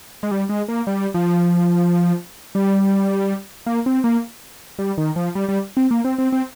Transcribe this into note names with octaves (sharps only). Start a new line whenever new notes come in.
G#3
G3
G#3
A#3
G3
F3
G3
A#3
C4
A#3
G3
D#3
F3
G3
G3
C4
A#3
C4
C4
C4